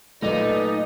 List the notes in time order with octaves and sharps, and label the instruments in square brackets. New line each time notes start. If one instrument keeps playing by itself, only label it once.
[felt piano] A#2 [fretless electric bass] F#3 A3 [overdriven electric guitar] D#4 [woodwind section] A4 B4 D5